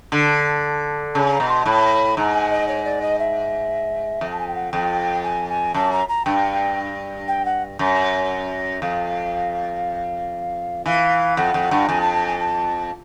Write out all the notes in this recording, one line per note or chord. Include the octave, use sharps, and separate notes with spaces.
D3
C#3 A5
A#5
B2
C6
A2 B5
G#2 A#5
G#5
D#5
C#5
D5
D#5
E5
F2
A5
G#5
G5
F#5
F2 G5
G#5
G#5
F#2 A5
A#5
A#5
G2 G5
G5
F#5
F#2
F2 F5
E3 F5
F2 F#5
F2
G2
F2 G#5
A5
A5
G#5
A5